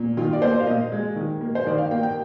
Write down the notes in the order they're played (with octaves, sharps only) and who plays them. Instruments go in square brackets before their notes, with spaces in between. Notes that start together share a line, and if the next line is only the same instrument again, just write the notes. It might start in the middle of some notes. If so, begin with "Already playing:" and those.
Already playing: [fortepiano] A#2
D#3 F4
D5
A#3 C5
F5
A#2 D#5
G#3
D#3
A#3
C5
D#3 D5
F5
A#3 G5
G5